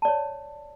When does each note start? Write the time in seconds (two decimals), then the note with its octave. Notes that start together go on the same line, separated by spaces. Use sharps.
0.02 A5
0.05 D5
0.08 C#5